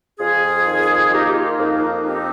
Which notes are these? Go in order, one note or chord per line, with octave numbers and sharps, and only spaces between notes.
F2 F4 G#4
D#3
A#3 D#4 G4
G4
F4
F2 D#4
D#4
C4 D#4 G4